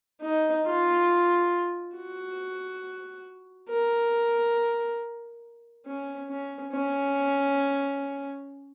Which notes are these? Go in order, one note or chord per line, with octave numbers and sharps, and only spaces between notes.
D#4
F4
F#4
A#4
C#4
C#4
C#4